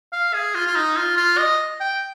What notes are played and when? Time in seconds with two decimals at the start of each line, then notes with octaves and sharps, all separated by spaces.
0.13 F5
0.34 G#4
0.55 F4
0.67 F4
0.76 D#4
0.97 F4
1.17 F4
1.38 D#5
1.80 G5